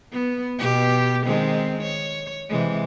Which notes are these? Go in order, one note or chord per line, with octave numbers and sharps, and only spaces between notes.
B3
B2 G4
D#3 G#3 C4
C#5
C3 E3 G#3